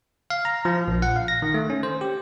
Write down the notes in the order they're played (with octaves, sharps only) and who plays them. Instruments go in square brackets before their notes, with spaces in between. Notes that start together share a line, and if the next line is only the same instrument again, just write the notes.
[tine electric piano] F5
A#5
F3
A#1
F#5
F5
A#6
D#3
A3
C#4
C5
G4